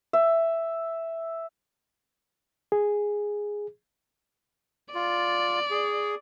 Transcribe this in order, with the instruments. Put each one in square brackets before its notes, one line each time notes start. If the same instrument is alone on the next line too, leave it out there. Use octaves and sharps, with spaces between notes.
[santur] E5
[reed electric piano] G#4
[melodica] F4 [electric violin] D5
[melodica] G#4